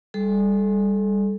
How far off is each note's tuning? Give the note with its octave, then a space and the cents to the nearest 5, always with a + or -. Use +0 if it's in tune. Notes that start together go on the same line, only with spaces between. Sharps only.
G3 +20 A4 -25